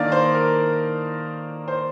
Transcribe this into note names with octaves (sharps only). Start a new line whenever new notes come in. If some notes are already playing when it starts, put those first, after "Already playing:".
Already playing: D#3 A#3 D4 D5 D#5 F5
C5
A#4
C5